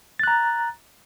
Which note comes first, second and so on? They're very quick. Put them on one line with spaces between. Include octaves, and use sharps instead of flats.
A6 F#6 A#5